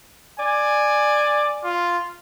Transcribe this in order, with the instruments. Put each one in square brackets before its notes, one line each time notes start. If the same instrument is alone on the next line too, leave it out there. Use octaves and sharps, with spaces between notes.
[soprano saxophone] D5 [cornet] G#5
[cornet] F4